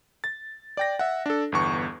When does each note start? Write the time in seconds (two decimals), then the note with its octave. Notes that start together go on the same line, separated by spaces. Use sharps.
0.24 A6
0.77 D5 G5 A#6
0.99 E5 F#5
1.26 D4 A4
1.52 G1 E2 C#6